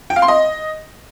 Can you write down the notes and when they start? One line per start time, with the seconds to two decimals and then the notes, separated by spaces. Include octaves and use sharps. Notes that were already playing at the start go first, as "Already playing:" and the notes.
0.10 G5
0.16 F5
0.22 C6
0.28 D#5